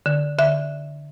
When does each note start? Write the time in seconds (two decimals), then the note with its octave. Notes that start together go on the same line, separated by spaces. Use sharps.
0.06 D3
0.39 D3 E5